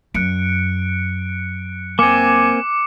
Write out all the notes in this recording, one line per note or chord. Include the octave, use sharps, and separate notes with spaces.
F#2 F#6 C#7 D7
A#3 C4 G#5 D6 C#7